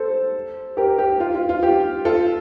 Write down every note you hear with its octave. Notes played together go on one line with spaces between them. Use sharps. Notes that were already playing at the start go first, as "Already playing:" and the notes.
Already playing: A4 C5
G4 A#4
G4
F4
F4
F4
G4
F4 A4